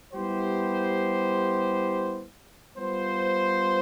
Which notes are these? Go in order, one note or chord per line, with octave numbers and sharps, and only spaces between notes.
G3 B3 E4 G4 C5
G3 B3 F4 C5